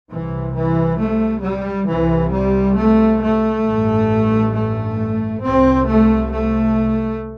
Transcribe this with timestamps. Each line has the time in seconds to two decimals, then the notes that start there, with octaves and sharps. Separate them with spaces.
0.11 C2 C3 E3
0.55 E3
1.00 A3
1.43 G3
1.87 C2 C3 E3
2.32 G3
2.76 A3
3.21 A3
3.65 A1 G2
4.54 A3
5.42 C2 C3 C4
5.86 A3
6.31 A3